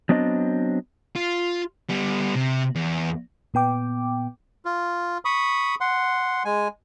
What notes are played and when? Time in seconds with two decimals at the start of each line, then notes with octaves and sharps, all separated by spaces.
0.09 F#3 B3 C4 D4 D#5
1.16 F4
1.89 G3 B3
2.35 C3
2.76 E2
3.54 A#2 B3 G5 D6
4.65 F4
5.25 B5 C#6 D#6
5.81 F#5 C6
6.45 G#3 G#5